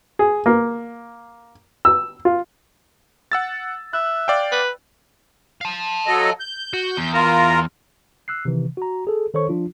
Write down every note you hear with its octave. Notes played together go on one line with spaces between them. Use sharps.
G#4
A#3
E6
F4
F#5 E6 A6
E5 F#6
D5 F5 G5
B4
F5 A5
F#3 A4 D#5
G6
F#4
E2
F4 A#4 A#5
E6 F#6 C7
C3 D#3 E3
F#4 A#5
G#4 A4
D#3 A4 C5 C#5 C#6
F3 D4 F4